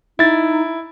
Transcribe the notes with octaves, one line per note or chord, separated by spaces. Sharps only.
D#4 E4 A6